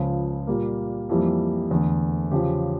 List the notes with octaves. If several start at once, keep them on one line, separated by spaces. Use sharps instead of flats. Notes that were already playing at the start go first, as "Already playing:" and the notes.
Already playing: C#2 C#3 F3
A#2 G3 A#3
F2 E3 G3 A#3
E2 D3 A3
E2 C#3 F3 C#4 G4